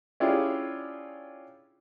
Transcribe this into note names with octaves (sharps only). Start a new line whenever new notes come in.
C#4 D4 E4 F4 G4 G#4